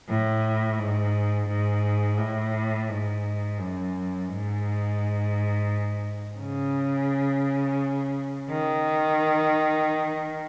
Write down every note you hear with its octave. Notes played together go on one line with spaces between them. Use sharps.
A2
G#2
G#2
A2
G#2
F#2
G#2
C#3
D#3